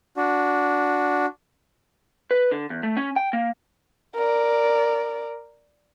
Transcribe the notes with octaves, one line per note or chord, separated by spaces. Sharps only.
D4 F#4
B4
D3
E2
A3
C#4
G5
A#3
A#4 D5